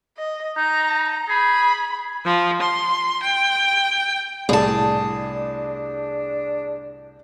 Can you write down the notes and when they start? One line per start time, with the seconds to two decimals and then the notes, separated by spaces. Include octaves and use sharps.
0.17 D#5
0.57 D#4 A#5
1.28 G#4 B5
2.24 F3
2.60 C6
3.22 G5
4.49 C2 A2 D4 G#4 A5